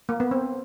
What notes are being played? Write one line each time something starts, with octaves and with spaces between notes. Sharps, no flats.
A#3
B3
C4